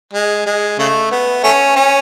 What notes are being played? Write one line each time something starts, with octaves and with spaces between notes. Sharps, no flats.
G#3
G#3
C#3 A3
B3
A3 C#4
C#4